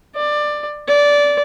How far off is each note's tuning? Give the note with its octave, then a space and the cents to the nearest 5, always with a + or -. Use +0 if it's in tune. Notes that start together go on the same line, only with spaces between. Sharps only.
D5 +15
D5 -15